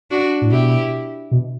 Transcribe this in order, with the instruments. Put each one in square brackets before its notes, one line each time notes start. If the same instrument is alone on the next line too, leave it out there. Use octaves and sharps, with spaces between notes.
[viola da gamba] D4 F#4
[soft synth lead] A2
[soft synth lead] B2 [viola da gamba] E4 G4
[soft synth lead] B2